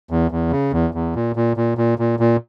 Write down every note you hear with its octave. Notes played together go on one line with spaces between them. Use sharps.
E2
E2
C#3
E2
E2
A#2
A#2
A#2
A#2
A#2
A#2